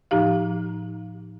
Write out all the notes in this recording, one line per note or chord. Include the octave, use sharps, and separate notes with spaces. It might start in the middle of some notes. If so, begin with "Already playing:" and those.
A2 F3 D#4 G4 F5